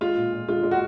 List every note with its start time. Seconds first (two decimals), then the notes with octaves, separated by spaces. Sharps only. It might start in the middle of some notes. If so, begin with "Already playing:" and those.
0.01 G#3 F4
0.16 A#2
0.32 A#2
0.48 G#3 F4
0.63 G#3
0.71 F#4